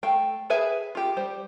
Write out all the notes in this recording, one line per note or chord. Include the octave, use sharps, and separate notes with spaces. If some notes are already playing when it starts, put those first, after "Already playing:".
A3 F5 G5
E4 G#4 B4 E5 G#5
F4 G4
G3 C5